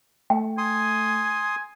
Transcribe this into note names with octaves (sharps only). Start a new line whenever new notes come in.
A3 G5
G#5 C6 D#6